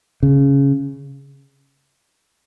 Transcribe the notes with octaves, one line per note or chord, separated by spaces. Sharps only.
C#3